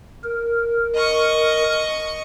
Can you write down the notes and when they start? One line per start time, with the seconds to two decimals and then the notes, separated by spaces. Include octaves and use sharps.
0.24 A#4
0.94 D#5 C#6